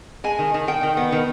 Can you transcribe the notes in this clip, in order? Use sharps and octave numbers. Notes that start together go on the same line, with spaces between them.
G#3 G#5
D#3
D#3
D#3 G5
D#3
B3
D#3